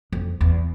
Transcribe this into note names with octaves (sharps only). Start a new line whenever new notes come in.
F2
E2